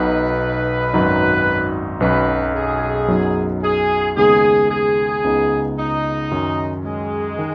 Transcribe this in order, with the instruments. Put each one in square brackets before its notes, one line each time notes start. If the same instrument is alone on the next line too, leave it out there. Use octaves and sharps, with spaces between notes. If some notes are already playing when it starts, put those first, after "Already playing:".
Already playing: [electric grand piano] B1 B2 B3 D#4 [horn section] B4
[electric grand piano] G#1 F#2 F#3 D#4
[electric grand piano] B1 B2 F#3 C#4 [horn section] B4
[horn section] G#4
[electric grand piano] F#2 F#3 B3 D#4
[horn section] G#4
[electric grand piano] D#2 C#3 G#3 B3 D#4 [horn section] G#4
[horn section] G#4
[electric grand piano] C#2 C#3 B3 D#4
[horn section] D#4
[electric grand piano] F#2 D#3 F#3 C#4
[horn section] G#3
[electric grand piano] D#3